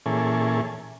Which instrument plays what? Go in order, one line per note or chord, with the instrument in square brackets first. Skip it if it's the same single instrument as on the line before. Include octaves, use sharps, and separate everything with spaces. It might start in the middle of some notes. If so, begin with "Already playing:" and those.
[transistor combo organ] A#2 E3 C#4 G#4 A4